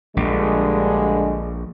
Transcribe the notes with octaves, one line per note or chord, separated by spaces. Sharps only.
A#1 G2 D3 G#3